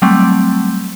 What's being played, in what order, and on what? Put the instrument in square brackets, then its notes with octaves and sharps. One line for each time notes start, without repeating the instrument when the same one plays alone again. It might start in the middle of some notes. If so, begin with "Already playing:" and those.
[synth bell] F#3 G3 A3 C4